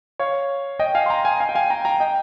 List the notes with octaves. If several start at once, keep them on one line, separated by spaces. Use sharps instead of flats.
C#5 F5
D#5 G5
F5 G#5
C6
G5 A#5
F5 G#5
F5 G#5
G5
F5 G#5
G5 A#5
G5 A#5
D#5 G5